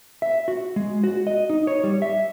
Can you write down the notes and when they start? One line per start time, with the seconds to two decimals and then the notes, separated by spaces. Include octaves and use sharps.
0.22 E5
0.48 F#4
0.76 G#3
1.04 F#4
1.27 D#5
1.50 D#4
1.67 C#5
1.84 G3
2.02 E5